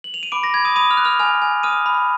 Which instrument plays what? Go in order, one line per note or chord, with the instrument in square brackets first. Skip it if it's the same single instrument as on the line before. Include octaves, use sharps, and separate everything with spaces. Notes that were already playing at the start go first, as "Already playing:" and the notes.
[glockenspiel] F#7
F7
D#7
B5 D6 D7
A#6
B5 G#6
D#6 D#7
B5 D#6 D#7
F6 F7
F#6
F6 F7
G#5 F6 F7
G#5
D#6 F6 D#7
B5